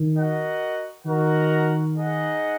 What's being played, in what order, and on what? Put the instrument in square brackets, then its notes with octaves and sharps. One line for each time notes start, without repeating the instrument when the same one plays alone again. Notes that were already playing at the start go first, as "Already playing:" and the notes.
Already playing: [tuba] D#3
[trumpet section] F#4 A#4 D#5 F#5
[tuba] D#3 [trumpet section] F#4 A#4 D#5 F#5
[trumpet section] D#4 G#4 D#5 F#5